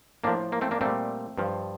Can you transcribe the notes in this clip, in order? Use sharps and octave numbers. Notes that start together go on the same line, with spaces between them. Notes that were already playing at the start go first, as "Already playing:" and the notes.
A2 F3 A#3 D4
A#3
A3 C4
A#3 D4
A#2 G3 A3 C4
G2 F3